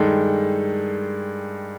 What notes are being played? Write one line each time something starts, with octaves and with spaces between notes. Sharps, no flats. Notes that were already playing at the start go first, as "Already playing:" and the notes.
Already playing: G2 D#3 G#3 A4